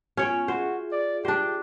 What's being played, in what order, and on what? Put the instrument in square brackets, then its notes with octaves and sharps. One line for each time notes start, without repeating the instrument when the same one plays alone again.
[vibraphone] B3 F4 G#5 [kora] C#4 C#5 G5
[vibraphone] F4 G#4 E5 [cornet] F#4 [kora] C5
[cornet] D5
[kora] D4 C5 [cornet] G4